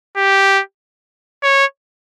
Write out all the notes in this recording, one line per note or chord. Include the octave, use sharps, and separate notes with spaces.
G4
C#5